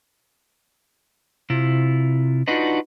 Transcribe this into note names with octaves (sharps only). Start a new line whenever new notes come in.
C3 E4 F4
D4 D#4 F4 F#4 B4 D#5